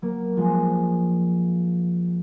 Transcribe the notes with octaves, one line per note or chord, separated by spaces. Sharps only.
F#3 A#3
F3 G#3